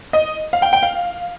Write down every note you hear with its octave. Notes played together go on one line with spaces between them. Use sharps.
D#5
F5
G5
G5
F5